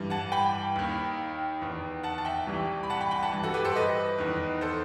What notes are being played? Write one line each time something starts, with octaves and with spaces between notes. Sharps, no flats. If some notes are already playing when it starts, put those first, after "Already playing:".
Already playing: G2 E3
F#5 A5
G5 B5
D#2 D#3
E2 D#3
F#5 A5
A5
E5 G5
C2 C3 E3
B5
F#5 A5
G5 B5
G5 B5
F#5 A5
G2 E3
F#4 A4
G4 B4
A4 C5
B4 D#5
E2 D#3
A4 C5